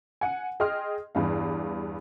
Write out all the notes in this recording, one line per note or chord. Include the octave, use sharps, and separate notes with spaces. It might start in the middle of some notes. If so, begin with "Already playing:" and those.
F#5 G#5
G#4 D#5 G5 C6 F6
E2 G2 F5